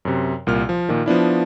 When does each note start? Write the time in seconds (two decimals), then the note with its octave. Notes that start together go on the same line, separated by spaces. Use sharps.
0.05 F#2 C3
0.47 C2 A#2 F6
0.69 F3
0.89 A#2 D#3
1.06 F3 B3 D4 E4